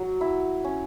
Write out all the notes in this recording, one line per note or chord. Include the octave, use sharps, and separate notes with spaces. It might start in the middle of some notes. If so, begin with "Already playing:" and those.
Already playing: F#3
E4
C#4